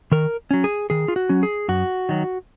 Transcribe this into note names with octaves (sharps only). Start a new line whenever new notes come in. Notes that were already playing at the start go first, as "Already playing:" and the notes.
D#3 A#4
F#3 C#4
G#4
D#3 G#4
F4
F#4
F#3 C#4
G#4
F#2 F#4
D#3 F#3